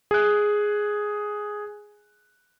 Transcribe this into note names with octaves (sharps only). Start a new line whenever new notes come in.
G#4 F#6